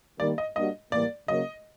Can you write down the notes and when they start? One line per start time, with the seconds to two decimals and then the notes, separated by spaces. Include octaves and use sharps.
0.20 D#3 G3 A#3 D5
0.38 D#5
0.56 G3 A#3 D4 F#4 D#5
0.92 A2 E3 G3 A#3 D5
1.28 C#3 F#3 A#3 D#5